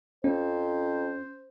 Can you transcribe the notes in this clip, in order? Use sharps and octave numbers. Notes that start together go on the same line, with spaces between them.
F2 C#4 C5